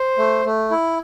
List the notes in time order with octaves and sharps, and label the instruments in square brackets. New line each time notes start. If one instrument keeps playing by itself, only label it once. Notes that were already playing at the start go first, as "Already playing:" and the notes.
Already playing: [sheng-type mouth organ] C5
A3
A3
E4